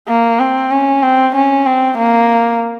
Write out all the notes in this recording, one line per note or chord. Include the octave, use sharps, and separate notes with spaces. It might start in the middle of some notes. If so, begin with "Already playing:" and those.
A#3
C4
C#4
C4
C#4
C4
A#3